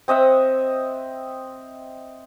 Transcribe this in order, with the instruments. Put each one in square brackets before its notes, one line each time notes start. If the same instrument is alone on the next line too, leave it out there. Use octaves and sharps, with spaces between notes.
[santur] C4 D#5 E5 F#5